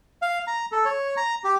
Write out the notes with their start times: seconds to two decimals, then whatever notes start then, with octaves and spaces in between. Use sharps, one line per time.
0.22 F5
0.47 A#5
0.72 A4
0.85 C#5
1.17 A#5
1.44 G4